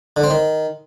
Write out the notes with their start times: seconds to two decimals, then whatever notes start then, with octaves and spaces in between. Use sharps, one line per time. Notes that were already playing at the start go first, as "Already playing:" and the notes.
0.16 D3
0.23 C4
0.30 D#3